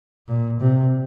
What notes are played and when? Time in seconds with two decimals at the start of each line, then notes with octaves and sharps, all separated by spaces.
0.28 A#2
0.60 C3